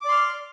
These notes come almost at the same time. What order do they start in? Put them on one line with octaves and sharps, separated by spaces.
D6 D5 C6 F6